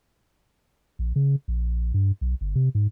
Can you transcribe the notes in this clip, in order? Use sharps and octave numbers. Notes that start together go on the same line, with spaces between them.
A#1
C#3
A#1
G2
B1
G1
C3
G#2